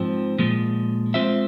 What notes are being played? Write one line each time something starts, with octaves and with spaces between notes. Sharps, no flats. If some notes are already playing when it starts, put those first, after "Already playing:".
Already playing: G#2 F3 C4
A#2 F3 G#3
G#3 C4 F4 C5 E5